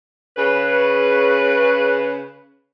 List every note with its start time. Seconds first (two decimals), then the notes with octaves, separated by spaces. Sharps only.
0.37 C#3 B4